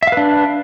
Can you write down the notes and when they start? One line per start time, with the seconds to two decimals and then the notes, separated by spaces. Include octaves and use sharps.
0.03 E5
0.07 F5
0.12 B4
0.17 D4